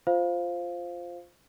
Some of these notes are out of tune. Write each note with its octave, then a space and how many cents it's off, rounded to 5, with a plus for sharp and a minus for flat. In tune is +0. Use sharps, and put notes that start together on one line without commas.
F4 +0 C5 +0 F5 +0